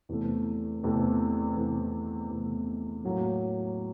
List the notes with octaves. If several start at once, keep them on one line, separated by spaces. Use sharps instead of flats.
E2 C3 E3 A3
E2 C3 E3 A3
E2 C3 E3 A3
E2 C3 E3 A3
A2 F#3 A#3